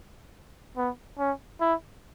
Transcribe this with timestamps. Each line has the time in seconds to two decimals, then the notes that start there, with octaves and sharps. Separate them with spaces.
0.77 B3
1.19 C#4
1.61 E4